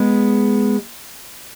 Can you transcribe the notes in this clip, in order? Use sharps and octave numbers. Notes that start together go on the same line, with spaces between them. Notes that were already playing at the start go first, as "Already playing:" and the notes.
Already playing: G#3 B3